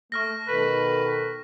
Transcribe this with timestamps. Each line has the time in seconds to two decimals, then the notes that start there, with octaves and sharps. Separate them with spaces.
0.12 A3 C#6 F6 A#6
0.48 B2 D#3 A4 B4